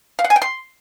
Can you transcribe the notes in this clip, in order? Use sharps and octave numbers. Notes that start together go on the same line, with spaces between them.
F5
F#5
G#5
G5
C6